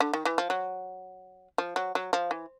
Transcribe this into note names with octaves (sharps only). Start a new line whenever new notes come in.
D3
D#3
E3
F3
F#3
F3
F#3
F#3
F3
E3